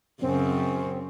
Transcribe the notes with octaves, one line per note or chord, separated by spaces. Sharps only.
F#2 C#3 C4 C#4